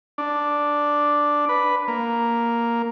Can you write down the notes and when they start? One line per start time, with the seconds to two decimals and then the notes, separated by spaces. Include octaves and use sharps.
0.18 D4
1.49 B4
1.88 A#3